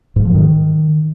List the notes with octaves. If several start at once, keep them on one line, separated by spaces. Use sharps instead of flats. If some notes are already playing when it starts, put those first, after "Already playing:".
G#2
F3
D#3